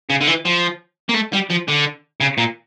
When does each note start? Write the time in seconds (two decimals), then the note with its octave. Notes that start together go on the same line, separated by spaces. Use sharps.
0.10 C#3
0.21 D3
0.27 E3
0.45 F3
1.09 A#3
1.14 A3
1.33 G3
1.50 F3
1.68 D3
2.20 C#3
2.38 A#2